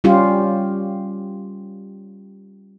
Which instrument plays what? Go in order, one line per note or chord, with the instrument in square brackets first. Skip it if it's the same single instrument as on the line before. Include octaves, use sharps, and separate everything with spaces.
[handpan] G3 C#4 F4 G4